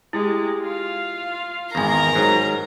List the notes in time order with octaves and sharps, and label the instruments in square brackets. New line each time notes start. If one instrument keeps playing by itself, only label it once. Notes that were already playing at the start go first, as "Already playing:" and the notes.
[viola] G#3 G4 [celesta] E4
[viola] F4 F5
[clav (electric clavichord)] G#1 E2 [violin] A#4 A#5 [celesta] G#5 A#6
[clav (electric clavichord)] G#2 F#3